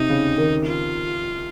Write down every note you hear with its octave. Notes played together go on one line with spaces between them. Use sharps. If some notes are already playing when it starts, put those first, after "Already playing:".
Already playing: C3 D#4
C#3
D#3
F4